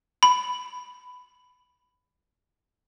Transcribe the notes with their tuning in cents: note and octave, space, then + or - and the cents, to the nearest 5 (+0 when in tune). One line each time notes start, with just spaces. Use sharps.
B5 +10